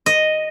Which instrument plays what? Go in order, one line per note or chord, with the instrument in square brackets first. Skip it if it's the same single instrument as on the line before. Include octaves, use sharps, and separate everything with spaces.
[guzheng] D#5